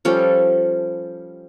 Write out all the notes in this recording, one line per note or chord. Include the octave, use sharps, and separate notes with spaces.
F3 G3 C#4 A4